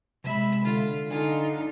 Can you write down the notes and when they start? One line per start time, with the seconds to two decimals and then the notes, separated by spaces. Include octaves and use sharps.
0.24 C3 G#3 E5 B5
0.64 D3 F4
1.11 D3 D4 D#4 F4 G#5